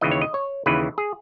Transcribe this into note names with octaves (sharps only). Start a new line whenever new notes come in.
D#2 C#3 E3 D#5
C#5
D#5
C#5
D#2 C#3 E3 B4
G#4